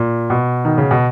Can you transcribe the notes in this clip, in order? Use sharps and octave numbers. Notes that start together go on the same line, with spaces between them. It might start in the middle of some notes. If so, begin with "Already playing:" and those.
Already playing: A#2
B2
D#3
C#3
B2